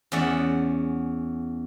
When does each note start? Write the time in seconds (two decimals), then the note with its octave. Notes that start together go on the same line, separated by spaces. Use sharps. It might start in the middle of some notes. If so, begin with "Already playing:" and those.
0.12 E2 C#4 D5 E5 F#5